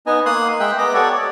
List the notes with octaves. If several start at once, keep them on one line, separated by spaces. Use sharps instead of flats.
B3 D#4 D#5 G#5
A#3 C6 D#6 F#6
G#3 E5 G5 F#6
B3 D#5 A#5 D6
G4 A4 C#5 D5 F#5
D5